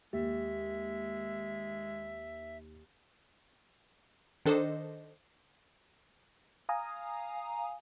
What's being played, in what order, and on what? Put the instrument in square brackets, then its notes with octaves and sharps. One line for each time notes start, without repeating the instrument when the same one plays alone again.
[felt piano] D#2 [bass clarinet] G#3 [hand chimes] G4 [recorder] E5
[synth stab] D#3 D4 A4 C5 D#5
[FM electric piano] F5 G#5 A#5 D#6